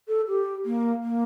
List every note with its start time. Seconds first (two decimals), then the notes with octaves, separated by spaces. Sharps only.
0.08 A4
0.28 G4
0.65 A#3
1.03 A#3